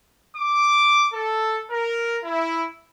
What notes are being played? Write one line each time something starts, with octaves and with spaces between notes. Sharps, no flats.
D6
A4
A#4
E4